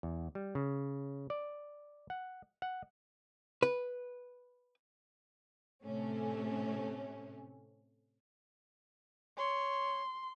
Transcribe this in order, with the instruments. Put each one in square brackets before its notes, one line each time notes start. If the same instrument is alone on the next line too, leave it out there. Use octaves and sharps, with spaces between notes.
[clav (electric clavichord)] E2
G3
C#3
D5
F#5
F#5
[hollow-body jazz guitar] B4
[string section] A2 C3 A3 C#4
[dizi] C#5 [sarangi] C6